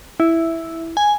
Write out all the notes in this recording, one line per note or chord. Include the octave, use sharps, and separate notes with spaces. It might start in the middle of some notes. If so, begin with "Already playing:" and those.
E4
G#5